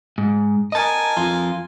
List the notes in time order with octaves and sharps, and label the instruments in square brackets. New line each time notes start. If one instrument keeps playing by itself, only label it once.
[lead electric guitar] G#2
[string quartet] A#4 G#5 [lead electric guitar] D#5 A5
[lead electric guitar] F2 F4